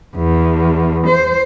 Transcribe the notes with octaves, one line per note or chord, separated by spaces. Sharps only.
E2
C5